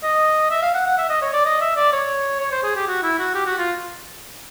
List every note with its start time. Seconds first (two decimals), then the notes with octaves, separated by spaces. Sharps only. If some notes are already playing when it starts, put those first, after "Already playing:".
0.03 D#5
0.50 E5
0.62 F5
0.74 F#5
0.86 F#5
0.98 E5
1.09 D#5
1.22 C#5
1.33 D5
1.45 D#5
1.61 E5
1.76 D5
1.92 C#5
2.40 C#5
2.52 C5
2.63 G#4
2.75 G4
2.87 F#4
3.03 E4
3.19 F#4
3.35 G4
3.46 F#4
3.58 F4